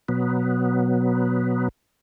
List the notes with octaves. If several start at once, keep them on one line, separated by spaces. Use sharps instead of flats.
B2 F#3 B3